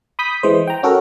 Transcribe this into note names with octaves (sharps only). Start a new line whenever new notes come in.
B5 D#6 G6 B6
E3 G#3 C5
G5 A#5
C#4 F#4 A4 A#4